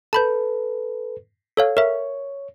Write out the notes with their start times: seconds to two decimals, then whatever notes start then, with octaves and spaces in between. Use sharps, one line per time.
0.13 A4 B4 A5 B5 G6
1.57 A4 C#5 F5
1.77 A#4 C#5 E5